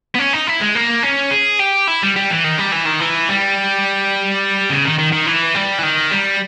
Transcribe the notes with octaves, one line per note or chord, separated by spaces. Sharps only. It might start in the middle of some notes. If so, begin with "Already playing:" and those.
B3
C#4
D#4
E4
G#3
A#3
C#4
G#4
G4
E4
G3
G3
E3
D#3
G3
E3
D#3
E3
G3
C#3
D#3
D#3
D#3
E3
G3
E3
D#3
G3